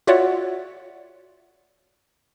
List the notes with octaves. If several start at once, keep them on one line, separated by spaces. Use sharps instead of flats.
F4 F#4 C#5 D5 E5 F#5